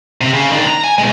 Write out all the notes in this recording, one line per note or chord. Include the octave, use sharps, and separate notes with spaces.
C3
C#3
D#3 D4
A#5
G#5
B2 G#3